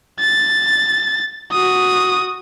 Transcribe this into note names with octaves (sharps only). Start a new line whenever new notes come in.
A6
F#4 D#6